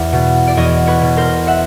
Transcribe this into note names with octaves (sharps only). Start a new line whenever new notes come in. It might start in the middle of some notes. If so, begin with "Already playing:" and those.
Already playing: E2 D5 E5
B2
D5
E2 C#5 D#5
B4 C#5
B2
A#4 C5
E5 F#5